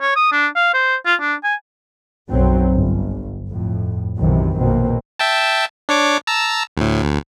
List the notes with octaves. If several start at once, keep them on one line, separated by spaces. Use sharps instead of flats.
C#5
D#6
D4
F5
C5
F4
D4
G#5
B1 F#2 F#3 C4
G1
F2 A2
B1 F#2 C3 D#3 E3 F#3
A#1 B2 A#3 C4
E5 G5 A5
D4 C#5 D6
A5 A#5 E6
D2 A2
D2